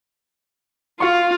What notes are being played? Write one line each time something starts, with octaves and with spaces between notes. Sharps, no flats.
F4 F5 C#6